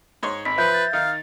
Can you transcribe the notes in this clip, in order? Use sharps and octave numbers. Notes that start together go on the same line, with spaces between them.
G#2 C#5 C6
G#1 B5 B6
F3 B4 E5 G6
A6
D#3 D#4 F5